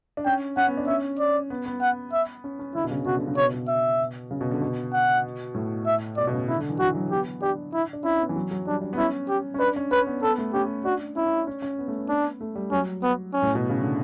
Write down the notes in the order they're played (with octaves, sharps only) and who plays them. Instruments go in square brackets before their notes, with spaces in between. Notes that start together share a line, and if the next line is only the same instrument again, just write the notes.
[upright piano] D4
[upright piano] C#4 [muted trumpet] G5
[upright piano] C#4 [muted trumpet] F#5
[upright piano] B3
D4
[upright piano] C#4 [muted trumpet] E5
[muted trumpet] D5
[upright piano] B3
B3
[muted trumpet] F#5
E5
[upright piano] C#4
C#4
[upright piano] D3 [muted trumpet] E4
[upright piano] B2
C#3
[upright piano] B2 [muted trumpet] F#4
[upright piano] D3
C#3
[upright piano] B2 [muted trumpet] C#5
[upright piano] B2
[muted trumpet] E5
[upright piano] C#3
B2
D3
B2
[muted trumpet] F#5
[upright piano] A2
[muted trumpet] E5
[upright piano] B2 [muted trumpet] D5
[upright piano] B2
C#3
[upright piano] D3 [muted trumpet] E4
[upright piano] D3
E3
[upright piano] E3 [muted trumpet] F#4
[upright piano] F#3
[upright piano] B3 [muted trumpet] G4
[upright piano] D4 [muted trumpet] G4
[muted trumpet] E4
[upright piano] D4
[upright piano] C#4 [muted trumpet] E4
[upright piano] B3
E3
F#3
F#3
[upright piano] G3 [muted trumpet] D4
[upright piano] D4
B3
[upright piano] C#4 [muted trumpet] E4
[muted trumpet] G4
[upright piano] C#4
[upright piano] D4 [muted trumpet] B4
[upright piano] C#4
[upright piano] C#4 [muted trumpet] B4
[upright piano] B3
[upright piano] B3 [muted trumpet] A4
[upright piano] A3
[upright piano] C#4 [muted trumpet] G4
[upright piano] D4 [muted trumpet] F#4
[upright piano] C#4 [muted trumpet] E4
[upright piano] C#4
C#4
C#4
B3
A3
B3
[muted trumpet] D4
[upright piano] A3
G3
[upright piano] F#3 [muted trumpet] C#4
[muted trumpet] B3
C#4
[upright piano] A2
B2
C#3
D3